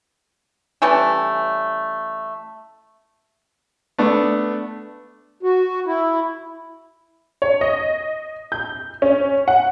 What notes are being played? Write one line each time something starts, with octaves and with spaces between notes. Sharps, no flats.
E3 G3 A3 C#4
A3 B3 D4
F#4
E4
C#5
D#5
G6
C#4
F#5